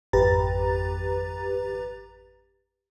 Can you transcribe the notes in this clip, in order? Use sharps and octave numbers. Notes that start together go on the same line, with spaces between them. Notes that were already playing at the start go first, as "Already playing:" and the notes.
G#1 F2 G4 B4 A#5 A6